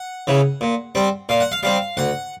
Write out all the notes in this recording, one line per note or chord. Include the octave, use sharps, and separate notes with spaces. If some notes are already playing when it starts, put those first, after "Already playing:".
Already playing: F#5
C#3 E3
A#2
G3 C4
A#2 F5
F#5
F5
G3 C4 F5
D2 F#5